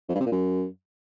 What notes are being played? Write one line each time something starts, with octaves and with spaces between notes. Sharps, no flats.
F2
G2
C3
A#2
F#2